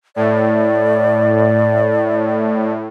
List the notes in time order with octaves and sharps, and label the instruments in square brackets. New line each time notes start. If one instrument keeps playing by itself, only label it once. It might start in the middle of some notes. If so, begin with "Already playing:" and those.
[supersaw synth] A2 [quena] D5